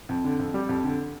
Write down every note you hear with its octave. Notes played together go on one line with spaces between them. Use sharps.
F2
D3
F2
G3
F2
D3